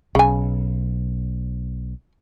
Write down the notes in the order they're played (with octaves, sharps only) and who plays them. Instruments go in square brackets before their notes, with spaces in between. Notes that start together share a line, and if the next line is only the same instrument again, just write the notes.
[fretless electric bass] B1 [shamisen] C#3 G#5